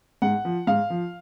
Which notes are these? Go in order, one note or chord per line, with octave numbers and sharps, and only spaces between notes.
G#2 F#5
F3
G#2 F5
F3